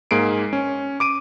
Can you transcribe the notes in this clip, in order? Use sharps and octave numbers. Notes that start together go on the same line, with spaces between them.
G#2 A#3 G#4 C7 D7
C#4
D6 D7 D#7